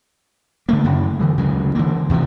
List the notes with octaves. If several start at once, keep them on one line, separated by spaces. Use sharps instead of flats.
D3 A3 A#3
F#2 C#3
D3 E3 G#3
D2 C#3 F#3 G#3
D3 E3 A#3
E2 C3 E3 F3